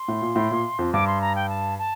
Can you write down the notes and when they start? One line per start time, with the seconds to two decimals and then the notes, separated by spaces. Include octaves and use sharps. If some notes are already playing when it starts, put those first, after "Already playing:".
Already playing: C6
0.08 A2
0.22 A#2
0.36 A2
0.51 A#2
0.79 F2
0.93 G2 D6
1.07 C6
1.21 A#5
1.36 G5
1.49 A5
1.79 A5